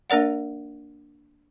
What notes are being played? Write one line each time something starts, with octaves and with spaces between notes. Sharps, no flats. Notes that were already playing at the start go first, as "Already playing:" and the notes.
A#3 D4 A#4 D5 F#5